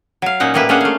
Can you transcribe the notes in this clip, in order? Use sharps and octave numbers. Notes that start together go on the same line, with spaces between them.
F#3 F5
A#2 C#4 D#4 F#5
A2 G3 A#3 E4 B4
A#3 C#4 D4 G#4 F#5
A3 F5